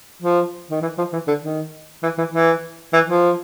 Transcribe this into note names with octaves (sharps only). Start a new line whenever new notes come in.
F3
D#3
E3
F3
E3
D3
D#3
E3
E3
E3
E3
F3